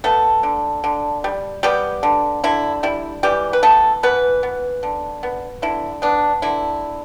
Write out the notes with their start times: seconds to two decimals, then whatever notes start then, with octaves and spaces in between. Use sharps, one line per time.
0.04 A3 B3 A4
0.43 D3
0.84 D3
1.24 G3
1.63 G3 B3 G4
2.03 D3
2.44 D3 E4
2.83 G3 E4
3.23 E3 G3 G4
3.53 B4
3.63 A3 B3 A4
4.03 E3 B3 B4
4.43 B3
4.83 D3
5.23 B3
5.62 D3 E4
6.02 B3 D4
6.42 D3 E4